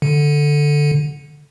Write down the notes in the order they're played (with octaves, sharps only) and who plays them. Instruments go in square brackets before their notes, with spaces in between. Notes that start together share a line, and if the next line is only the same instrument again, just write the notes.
[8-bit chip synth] D3